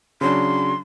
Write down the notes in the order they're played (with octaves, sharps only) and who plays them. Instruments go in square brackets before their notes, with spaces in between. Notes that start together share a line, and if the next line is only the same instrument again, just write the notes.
[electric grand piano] C#3 F#3 D4 [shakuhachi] C6